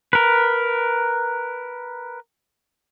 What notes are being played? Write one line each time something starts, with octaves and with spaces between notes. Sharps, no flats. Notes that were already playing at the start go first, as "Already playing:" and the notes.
A#4 B4